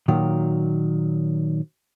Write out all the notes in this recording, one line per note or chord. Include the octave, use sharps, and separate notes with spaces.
A#2 D#3 F#3